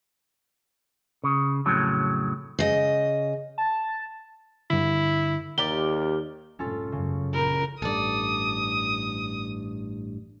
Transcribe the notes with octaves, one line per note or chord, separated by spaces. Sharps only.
C#3
F2 A2 C#3 F#3
C#3 D#5
A5
G2 D3 E4
D#2 G4 A#4 D5 G7
F1 C2 G#2 C#4 F4 A4
F1 F#2 C#3
A#1 A#4 B5 G6
A1 G2 A4 D5 D#6